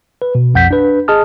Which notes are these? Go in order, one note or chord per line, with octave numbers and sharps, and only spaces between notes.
B4
B2
B1 F2 F#5 G6 B6
D4 B4
G#4 D#5 A5 D#6 F6